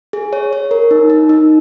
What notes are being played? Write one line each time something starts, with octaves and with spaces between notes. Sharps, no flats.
G#4
C#5
C#5
A#4
D#4
D#4
D#4